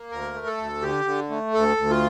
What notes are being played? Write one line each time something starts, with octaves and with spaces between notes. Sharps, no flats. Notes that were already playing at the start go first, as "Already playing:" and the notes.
Already playing: A#3
D2 A#4
A3
A4
D2
D3 G4
D3
A3
D2 A4
D2
F4